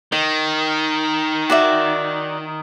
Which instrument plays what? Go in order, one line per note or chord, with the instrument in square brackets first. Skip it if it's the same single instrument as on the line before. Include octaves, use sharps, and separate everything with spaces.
[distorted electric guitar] D#3 [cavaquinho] D#5
[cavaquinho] F#4 D5 E5